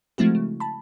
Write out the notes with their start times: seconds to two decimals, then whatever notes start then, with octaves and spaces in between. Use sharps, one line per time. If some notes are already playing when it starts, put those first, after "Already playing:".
0.18 F3 G#3 A3 C4 E4 F#4
0.35 C#3
0.60 A5 B5